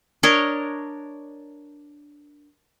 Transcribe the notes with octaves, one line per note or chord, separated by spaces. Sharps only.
D4 A#4 C#5 D#5